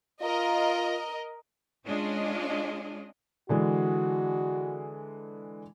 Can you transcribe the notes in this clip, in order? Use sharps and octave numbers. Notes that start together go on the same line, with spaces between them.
F4 A#4 D#5
G#3 C#4 D4 F4 G#4 D#5
D3 E3 G#3 F#4